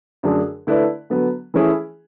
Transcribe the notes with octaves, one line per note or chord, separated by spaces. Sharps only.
F#2 D3 A3 D4 G#4
D3 A3 E4 B4 D5
D3 F#3 B3
E3 A3 C#4 E4 G#4